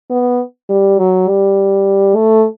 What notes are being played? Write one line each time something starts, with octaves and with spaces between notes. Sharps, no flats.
B3
G3
F#3
G3
A3